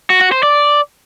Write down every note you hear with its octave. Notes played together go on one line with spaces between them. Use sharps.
F#4
F#4
C5
D5